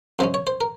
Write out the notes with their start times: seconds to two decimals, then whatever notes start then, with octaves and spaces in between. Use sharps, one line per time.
0.19 F#2 C#3 G#3 C#4 C5
0.34 C#5
0.47 C5
0.61 A#4